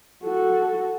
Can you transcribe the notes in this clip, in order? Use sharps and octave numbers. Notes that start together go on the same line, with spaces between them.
F#4 A4